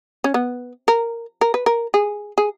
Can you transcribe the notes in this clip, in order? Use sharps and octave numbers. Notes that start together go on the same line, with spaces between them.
C#4
B3
A#4
A#4
B4
A#4
G#4
G#4